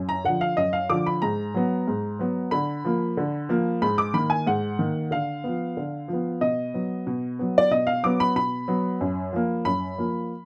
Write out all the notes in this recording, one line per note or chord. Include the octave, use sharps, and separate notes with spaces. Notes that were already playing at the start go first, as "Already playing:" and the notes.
Already playing: F#2
A#5
D3 F3 F#5
F5
F#2 D#5
F5
D3 F3 D6
B5
G#2 A#5
F#3 B3
G#2
F#3 B3
D3 B5
F3 A#3
D3
F3 A#3
G#2 B5
D6
D#3 A#3 B5
G#5
G#2 F#5
D#3 A#3
D3 F5
F3 B3
D3
F3 B3
B2 D#5
F#3 B3
B2
F#3 B3
D5
B2 D#5
F5
F#3 B3 D6
B5
B2 B5
F#3 B3
F#2
F3 A#3
F#2 B5
F3 A#3